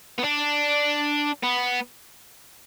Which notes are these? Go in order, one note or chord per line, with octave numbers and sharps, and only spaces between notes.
B3
D4
B3